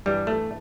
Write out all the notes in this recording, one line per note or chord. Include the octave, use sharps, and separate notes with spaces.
G2 E3 G3
A3